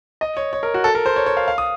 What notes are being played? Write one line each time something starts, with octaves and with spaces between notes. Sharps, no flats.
D#5
C#5
C#5
A#4
F#4
A4
A#4
C5
C#5
C#5
F5
F5
D#6